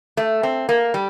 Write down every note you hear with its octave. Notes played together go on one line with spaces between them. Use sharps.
A3
C4
A#3
G3